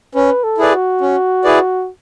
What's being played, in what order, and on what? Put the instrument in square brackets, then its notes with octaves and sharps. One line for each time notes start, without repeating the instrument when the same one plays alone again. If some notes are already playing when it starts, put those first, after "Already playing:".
[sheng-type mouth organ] C#4 [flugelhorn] B4
[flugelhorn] A4
[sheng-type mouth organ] E4 G#4 B4 D5
[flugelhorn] F#4
[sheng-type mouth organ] C#4
E4 G#4 B4 D5